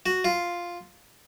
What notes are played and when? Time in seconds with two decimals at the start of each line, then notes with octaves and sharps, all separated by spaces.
0.06 F#4
0.25 F4